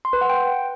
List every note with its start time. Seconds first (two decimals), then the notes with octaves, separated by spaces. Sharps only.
0.05 C6
0.13 B4
0.21 F#5
0.30 G5